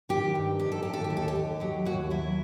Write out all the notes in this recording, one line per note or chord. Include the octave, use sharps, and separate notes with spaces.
D#3 G4
G2
D#3 G4
A4
D#3 G4
A4
G4
D#2
A4
G4
D#2
F#3 G4
D#2 F#4
F#3 E4